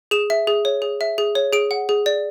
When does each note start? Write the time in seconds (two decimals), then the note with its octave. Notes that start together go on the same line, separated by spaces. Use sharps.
0.11 G#4 E7
0.30 E5
0.47 G#4
0.65 C#5
0.82 G#4
1.01 E5
1.18 G#4
1.35 C#5
1.53 G#4 D7
1.71 F#5
1.89 G#4
2.06 D5